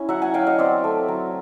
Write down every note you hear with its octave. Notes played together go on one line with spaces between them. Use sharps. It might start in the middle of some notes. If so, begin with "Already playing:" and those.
Already playing: C#4 E4
F#3 E5 F#5
F#5 G#5
F#3 F5 G5
D#5 F5
C4 D5 E5
A3
F#3